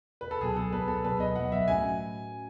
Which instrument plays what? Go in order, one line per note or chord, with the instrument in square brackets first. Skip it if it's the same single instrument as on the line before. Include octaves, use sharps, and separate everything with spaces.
[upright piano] B4
A4
[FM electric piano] C#2 B2 F#3 B3 [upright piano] G#4
[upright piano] A4
[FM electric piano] C#2 B2 F#3 B3 [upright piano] B4
[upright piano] A4
[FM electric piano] C#2 B2 F#3 B3 [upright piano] B4
[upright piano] D#5
[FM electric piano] C#2 B2 F#3 B3 [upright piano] F#5
[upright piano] E5
[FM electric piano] A2 F#3 A3 C#4 F#4 [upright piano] G#5